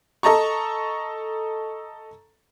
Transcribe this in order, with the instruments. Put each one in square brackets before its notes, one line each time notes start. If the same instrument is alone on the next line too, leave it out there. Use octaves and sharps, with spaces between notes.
[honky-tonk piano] A4 D#5 A5 A#5 C#6